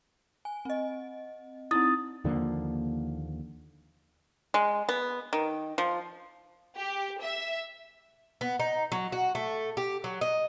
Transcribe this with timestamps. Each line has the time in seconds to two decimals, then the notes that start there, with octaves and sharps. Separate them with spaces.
0.45 G#5
0.65 C4 D#5
1.71 C4 D#4 E4 D#6 A6
2.24 D#2 D3 F3 A#3
4.54 G#3
4.89 B3
5.33 D#3
5.78 F3
6.78 G4
7.21 E5
8.41 B3
8.60 D#4
8.92 F#3
9.12 F#4
9.35 A3
9.77 G4
10.04 F#3
10.21 D#5